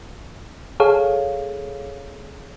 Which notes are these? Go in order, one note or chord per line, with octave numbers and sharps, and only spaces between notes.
G#4 A4 C#5 F5